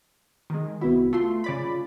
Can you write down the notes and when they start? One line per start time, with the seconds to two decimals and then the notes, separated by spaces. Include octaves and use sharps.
0.50 D#3 G#3
0.81 C2 B3 E4 F#4
1.13 A3 F4 C6
1.44 C#3 D5 B5